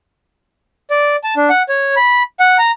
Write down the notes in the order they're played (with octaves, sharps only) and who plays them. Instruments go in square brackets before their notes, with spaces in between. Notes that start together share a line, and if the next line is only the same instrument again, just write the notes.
[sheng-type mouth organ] D5
A5
D4
F#5
C#5
B5
F#5
A#5